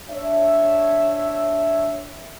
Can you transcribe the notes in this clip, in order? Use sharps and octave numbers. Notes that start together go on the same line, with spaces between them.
D4 C#5 E5